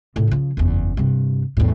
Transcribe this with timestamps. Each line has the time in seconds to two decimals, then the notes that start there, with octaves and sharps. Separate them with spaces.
0.16 A2 C3
0.28 C#3 F3
0.57 F#1 E2
0.97 G2 C3
1.57 E2 A2